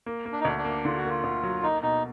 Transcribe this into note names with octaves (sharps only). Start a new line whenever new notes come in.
A#3
A#3
D4
D#4
D2 D4
D4
A#3
D3 F4
F#4
A#3
F4
D2
F#3
A#3 D#4
B2 D#4